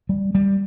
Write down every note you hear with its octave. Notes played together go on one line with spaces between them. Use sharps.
G3
G3